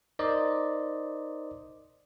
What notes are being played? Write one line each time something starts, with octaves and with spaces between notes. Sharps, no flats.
D#4 A#4 C5 D5 D#5